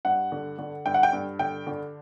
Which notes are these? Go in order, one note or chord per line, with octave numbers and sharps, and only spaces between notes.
G2 F#5
D3
D3
G2 G5
F#5
G5
G2
D3 G5
D3